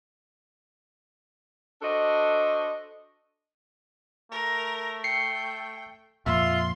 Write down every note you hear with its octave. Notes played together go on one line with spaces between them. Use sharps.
D4 F#4 A4 C5 D#5
A3 A#4
G5 C7 C#7
F2 A#2 F4 E5 C6 E6